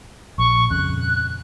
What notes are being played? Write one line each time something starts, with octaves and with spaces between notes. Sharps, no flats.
A#1 C#6
D#1 F2 C#3 F#6